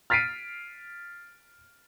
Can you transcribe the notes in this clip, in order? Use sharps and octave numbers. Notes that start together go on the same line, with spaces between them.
F6 A6 B6 C7 D7 D#7